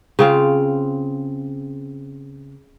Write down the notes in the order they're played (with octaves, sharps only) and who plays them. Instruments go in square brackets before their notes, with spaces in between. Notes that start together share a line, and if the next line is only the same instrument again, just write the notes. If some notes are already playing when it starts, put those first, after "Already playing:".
[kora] C#3 C4 F4